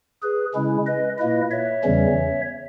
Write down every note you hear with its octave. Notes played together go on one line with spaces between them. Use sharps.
G#4 B4
C#3 G#3 C#4 E4
B4 D#5
A#2 A#3 E4 B4 D#5
C#5 E5
E2 C#3 E3 G3 C#4